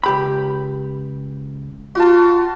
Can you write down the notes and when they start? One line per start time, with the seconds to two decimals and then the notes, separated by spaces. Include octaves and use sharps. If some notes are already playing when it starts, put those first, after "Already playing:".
0.04 C#2 G4 B5
1.95 F4 F#4 A5